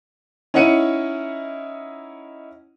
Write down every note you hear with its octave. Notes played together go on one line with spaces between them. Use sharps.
C#4 D#4 E4 F#5 C#7 D#7